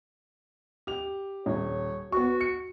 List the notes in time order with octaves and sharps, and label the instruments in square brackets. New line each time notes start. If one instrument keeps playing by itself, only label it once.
[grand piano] G4 F7
[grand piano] D#1 [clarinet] C#5
[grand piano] B3 C#6 [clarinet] F#4
[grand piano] C#7